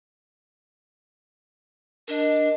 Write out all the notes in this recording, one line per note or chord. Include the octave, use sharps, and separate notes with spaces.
D4 A#4 D#5